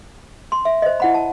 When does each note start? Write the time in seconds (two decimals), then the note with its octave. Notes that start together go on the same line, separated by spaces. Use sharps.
0.52 C6
0.65 E5
0.82 C5 D#5
1.00 E4 F#5 B5
1.14 A5